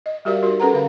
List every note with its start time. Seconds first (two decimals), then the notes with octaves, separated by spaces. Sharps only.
0.06 D#5
0.25 G3 F#4 G4 A#4 D5 F5
0.43 D#4 F#4 G4 A#4
0.60 C#4 A4 B4 F#5 A#5
0.73 D3 C#4 A#4 F5